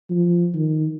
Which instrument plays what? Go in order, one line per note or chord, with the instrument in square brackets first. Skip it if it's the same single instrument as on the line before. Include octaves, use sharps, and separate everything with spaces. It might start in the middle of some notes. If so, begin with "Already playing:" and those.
[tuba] F3
D#3